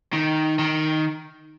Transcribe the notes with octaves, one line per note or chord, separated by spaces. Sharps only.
D#3
D#3